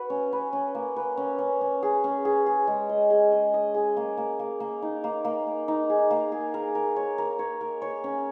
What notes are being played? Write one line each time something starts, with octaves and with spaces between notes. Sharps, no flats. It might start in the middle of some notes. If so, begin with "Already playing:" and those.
Already playing: F#4 B4
C#4
B4
C#4
A#3
B4
C#4
C#4
C#4
G#4
C#4
G#4
G#4
G#3
D#5
G#4
D#5
D#5
G#4
A#3
A#3
A#3
A#3
D#4
A#3
A#3
A#3
D#4
G#4
A#3
G#4
A#4
A#4
C#5
A#4
C#5
A#4
C#5
C#4